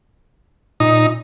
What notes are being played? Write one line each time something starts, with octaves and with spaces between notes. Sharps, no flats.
A#2 D#4